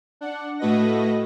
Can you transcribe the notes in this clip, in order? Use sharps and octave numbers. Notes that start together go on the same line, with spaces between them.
D4 F#5
A2 A3 F#4 B4 D#5 A#6